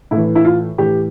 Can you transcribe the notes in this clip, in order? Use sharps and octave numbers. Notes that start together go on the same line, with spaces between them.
A2 E3 E4
E4
F4
A2 E3 G4